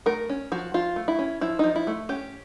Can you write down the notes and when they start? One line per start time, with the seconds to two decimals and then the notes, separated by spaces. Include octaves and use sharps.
0.06 A3 A#4
0.29 C#4
0.52 F3 F#4
0.74 F3 F4
0.96 A3
1.08 E4
1.19 C#4
1.41 F3 E4
1.59 F3 D#4
1.76 E4
1.87 A3
2.09 C#4 G4